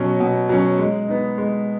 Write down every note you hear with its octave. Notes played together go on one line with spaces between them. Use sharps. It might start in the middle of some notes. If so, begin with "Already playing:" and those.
Already playing: B2 F#3 C#4
B2
F#3 C#4
G#3
B3 D#4
G#3